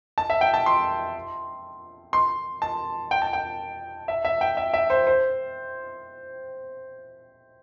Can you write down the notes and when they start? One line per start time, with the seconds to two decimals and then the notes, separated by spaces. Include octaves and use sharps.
0.18 A5
0.30 E5
0.41 G5
0.54 A5
0.66 C6
2.13 C6
2.62 A5
3.11 G5
3.22 A5
3.33 G5
4.08 E5
4.25 E5
4.41 G5
4.57 E5
4.73 E5
4.90 C5
5.07 C5